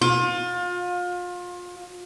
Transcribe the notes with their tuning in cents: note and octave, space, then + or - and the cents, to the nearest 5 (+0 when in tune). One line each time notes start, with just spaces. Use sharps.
F4 +30